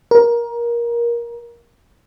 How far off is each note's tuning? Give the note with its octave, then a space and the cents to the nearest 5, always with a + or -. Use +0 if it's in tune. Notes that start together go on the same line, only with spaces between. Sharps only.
A#4 +20